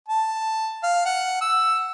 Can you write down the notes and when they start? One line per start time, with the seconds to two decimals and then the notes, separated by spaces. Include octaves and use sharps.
0.08 A5
0.83 F5
1.06 F#5
1.41 E6